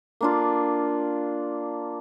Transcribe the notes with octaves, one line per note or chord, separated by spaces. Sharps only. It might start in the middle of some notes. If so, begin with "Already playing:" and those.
A#3 D4 F4